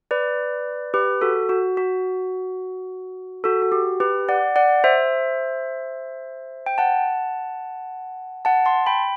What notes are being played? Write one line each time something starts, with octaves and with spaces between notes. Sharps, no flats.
B4 D5
G4 B4
F#4 A4
F#4
F#4
F#4 A4
F#4
G4
G4 B4
D5 F#5
D5 F#5
C5 E5
G5
F#5 A5
F#5 A5
A5 C6
G5 B5